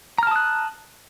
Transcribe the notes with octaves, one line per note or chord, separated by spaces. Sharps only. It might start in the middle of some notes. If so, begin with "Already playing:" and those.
A5 A#5 D#6 F6 F#6